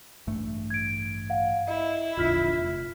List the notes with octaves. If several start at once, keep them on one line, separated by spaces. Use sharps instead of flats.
A1 G2 A3
G#6 D7
F5 F#5
E4 D#5
E1 A#1 D3 F4 F6 B6
F1